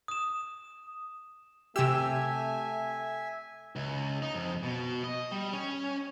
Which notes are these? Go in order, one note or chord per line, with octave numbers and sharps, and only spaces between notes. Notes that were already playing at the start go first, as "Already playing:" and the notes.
D#6 E7
C3 A3 G4 E5 G#5 E6
C#2
D#4
F2
B2
D#5
G3
C#4